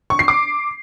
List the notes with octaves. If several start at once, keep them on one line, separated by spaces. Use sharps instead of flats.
C#6
C7
D6